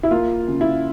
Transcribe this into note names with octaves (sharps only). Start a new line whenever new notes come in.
E4
A#3 F4
C#3
E4